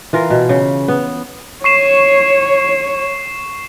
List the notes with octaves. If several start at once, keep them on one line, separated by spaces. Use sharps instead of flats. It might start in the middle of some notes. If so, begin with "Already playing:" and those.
E3 F4 A#4
B2
C#3
B3
C#5 C#6 C7 E7